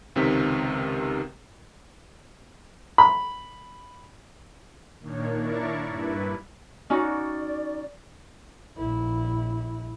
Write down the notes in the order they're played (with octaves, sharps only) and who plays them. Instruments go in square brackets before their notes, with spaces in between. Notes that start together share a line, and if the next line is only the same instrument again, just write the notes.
[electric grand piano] C#2 C3 D#3 C4 B6
[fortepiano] B5
[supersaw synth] A#2 D#3 A#3 D4 C#5
D4 E4 A#4 D5 C#6
G2 E4 B4
[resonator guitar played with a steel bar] C#4 D#4 F#4 [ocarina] D5
[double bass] A#1 E4